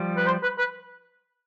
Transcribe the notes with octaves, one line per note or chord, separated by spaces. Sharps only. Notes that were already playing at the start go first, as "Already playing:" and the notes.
Already playing: F3 G3
B4
C5
B4
B4